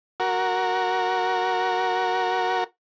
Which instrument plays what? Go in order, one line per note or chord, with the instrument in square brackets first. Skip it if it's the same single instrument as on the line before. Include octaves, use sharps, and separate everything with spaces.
[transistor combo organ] F#4 A#4